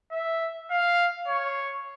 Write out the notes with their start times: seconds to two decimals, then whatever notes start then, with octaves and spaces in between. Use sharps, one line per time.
0.12 E5
0.71 F5
1.28 C#5